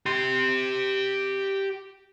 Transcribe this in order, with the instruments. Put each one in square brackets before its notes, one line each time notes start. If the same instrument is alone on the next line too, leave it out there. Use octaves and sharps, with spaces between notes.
[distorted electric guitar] G4 C6